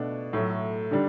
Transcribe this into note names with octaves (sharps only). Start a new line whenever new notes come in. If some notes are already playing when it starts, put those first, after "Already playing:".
Already playing: B2 A3 D4
A2 F#3 A3
D3 G3 D4